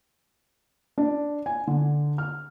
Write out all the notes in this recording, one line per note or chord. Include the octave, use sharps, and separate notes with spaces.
D4
G#5
D3
F6